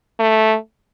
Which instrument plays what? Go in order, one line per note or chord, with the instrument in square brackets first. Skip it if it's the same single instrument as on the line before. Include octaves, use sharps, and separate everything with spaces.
[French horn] A3